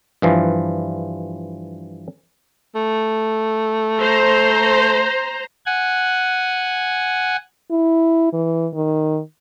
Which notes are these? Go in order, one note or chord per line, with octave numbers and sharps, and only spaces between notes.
G2 E3 F3
A3
C5 A#5
F#5 G#5
E4
E3
D#3